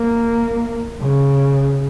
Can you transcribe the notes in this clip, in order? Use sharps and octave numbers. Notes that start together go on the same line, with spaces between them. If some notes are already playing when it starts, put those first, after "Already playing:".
Already playing: A#3
C#3